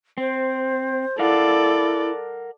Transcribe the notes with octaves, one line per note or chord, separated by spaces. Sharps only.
C4 C5
E4 A4 A#4 D5 F5 F#5